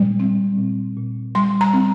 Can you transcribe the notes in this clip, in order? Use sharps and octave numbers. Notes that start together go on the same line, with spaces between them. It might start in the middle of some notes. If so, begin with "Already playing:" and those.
Already playing: A#2 G3
C4
A#2
A#2
G3 C6
A#5
C4